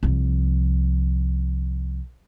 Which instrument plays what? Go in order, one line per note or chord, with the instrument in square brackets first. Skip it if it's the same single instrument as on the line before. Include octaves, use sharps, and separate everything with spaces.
[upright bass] C2 F3